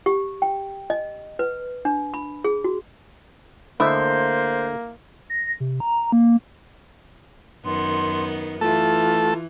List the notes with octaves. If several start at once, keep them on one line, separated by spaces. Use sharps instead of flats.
G4
G5
D#5
B4
D4
B5
G#4
F#4
D3 A3 A#3 E4 C5 D#5 E5
A#6
C3
A#5
A#3
F#2 D#3 B3 C6
E3 A3 F4 A4